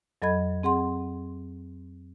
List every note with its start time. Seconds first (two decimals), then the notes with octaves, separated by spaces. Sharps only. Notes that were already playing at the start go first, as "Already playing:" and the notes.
0.22 F2 F#3 A4 D#5 B5 G#6
0.63 C4 G#4 F#5 C6